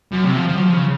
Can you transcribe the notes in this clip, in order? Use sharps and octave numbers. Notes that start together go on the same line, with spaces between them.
F#2
C3
F3
F3
F#3
F3
C#3